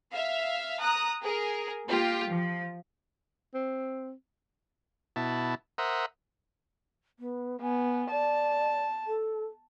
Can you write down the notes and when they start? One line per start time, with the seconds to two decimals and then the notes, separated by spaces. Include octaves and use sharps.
0.12 E5 F5
0.81 A#5 D#6 F#6
1.23 G#4 A#4
1.88 A#3 F4 G4
2.28 F3
3.54 C4
5.16 B2 E4 A5
5.78 A#4 C5 E5 F#5 D#6
7.19 B3
7.62 B3 G#5
8.11 D5 A5
9.07 A4